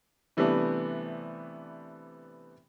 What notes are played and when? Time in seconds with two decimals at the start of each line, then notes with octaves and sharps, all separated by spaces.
0.37 C3 E3 G3 A3 B3 D4